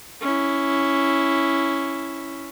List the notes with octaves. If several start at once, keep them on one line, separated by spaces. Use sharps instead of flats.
C#4 E4